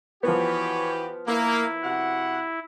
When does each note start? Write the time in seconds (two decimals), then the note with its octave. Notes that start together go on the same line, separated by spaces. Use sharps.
0.23 E3 F3 B3 F#4 G4 C#5
1.27 A#3 E4
1.83 C3 F#4 F#5